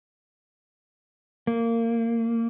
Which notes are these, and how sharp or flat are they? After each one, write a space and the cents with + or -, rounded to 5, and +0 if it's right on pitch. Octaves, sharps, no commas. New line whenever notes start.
A#3 -20